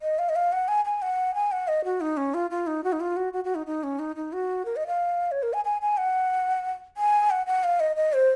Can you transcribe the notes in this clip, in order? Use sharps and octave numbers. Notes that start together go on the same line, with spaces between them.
D#5
F5
D#5
F5
F#5
G#5
G#5
F#5
G#5
F#5
D#5
F#4
D#4
C#4
F4
F4
D#4
F#4
D#4
F4
F#4
F#4
F#4
D#4
D#4
C#4
D#4
D#4
F#4
A#4
D#5
F5
C#5
A#4
G#5
G#5
G#5
F#5
G#5
F#5
F#5
F5
D#5
D#5
C5